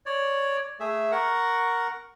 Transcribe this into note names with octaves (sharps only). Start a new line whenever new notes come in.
C#5 D5
A3 G#4 E5
A#4 F#5 C#6